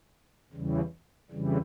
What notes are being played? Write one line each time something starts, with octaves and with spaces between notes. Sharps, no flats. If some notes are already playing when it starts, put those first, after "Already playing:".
E2 C#3 E3 G3
F2 C#3 E3 G3